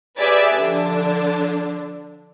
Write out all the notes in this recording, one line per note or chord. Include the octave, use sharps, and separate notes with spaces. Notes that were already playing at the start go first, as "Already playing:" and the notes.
G4 G#4 B4 D5 E5 G#5
D3 F3 D4